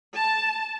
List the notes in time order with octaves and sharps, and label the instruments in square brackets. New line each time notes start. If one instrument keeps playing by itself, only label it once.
[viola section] A5